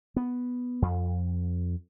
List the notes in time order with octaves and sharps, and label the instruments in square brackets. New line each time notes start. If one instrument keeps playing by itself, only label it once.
[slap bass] B3
F2